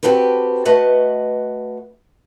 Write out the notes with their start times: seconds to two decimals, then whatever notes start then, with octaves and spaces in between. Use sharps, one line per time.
0.03 C4 F#4 G4 A4 B4
0.65 A3 F#4 B4 D#5 F#5